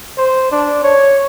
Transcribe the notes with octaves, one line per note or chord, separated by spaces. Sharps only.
C5
D4
C#5